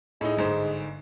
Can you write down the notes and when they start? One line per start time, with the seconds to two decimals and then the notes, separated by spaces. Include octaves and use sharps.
0.21 A2 G#3 D#4
0.37 G1 G#2 C5